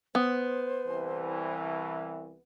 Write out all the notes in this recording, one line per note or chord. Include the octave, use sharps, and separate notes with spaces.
B3 C5
C2 E3